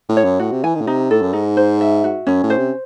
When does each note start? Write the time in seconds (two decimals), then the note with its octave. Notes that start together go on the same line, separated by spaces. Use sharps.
0.09 A2
0.17 C#5
0.24 F#2
0.40 A2 F#4
0.52 C3
0.63 E3 G#5
0.75 D#3
0.81 A2
0.87 C3 D#4
1.11 A2 A4
1.22 F#2
1.33 G#2 D#4
1.57 C5
1.81 E5
2.04 F#4
2.27 F#2 C#4
2.43 A2
2.50 C5
2.58 C3